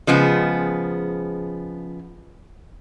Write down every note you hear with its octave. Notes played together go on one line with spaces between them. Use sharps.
C#3 F3 G#3 B3